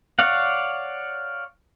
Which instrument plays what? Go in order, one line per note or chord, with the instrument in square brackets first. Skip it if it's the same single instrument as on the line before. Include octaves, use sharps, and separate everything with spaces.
[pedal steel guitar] C#5 D5 F5 F#5